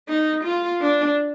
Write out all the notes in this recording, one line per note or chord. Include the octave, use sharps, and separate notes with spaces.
D#4
F4
D4